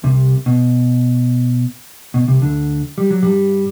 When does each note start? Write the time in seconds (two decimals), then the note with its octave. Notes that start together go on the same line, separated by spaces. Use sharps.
0.04 C2 C3
0.46 B2
2.14 B2
2.28 C2 C3
2.42 D2 D3
2.98 G3
3.10 F#3
3.23 G2 G3